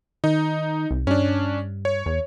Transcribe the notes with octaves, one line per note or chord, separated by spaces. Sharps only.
D#3 D#4
C2
G2 C#4 D4
C#5
E2